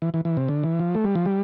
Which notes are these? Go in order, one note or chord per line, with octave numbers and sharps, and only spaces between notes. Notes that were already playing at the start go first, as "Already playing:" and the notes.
E3
E3
E3
C3
D3
E3
F3
A3
G3
F3
G3